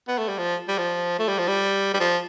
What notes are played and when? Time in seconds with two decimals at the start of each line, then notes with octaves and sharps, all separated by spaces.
0.08 B3
0.18 A3
0.29 G3
0.38 F3
0.69 G3
0.78 F3
1.19 A3
1.28 G3
1.38 F3
1.48 G3
1.94 G3
2.00 F3